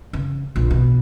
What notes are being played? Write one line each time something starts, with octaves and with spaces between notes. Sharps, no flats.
C#3
A#1
B2